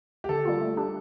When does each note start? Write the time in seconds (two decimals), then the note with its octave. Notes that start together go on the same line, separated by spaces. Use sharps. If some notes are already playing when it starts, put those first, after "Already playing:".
0.24 G4
0.29 D3 A4
0.45 G3 A#3 F4
0.61 A3
0.77 D4 G4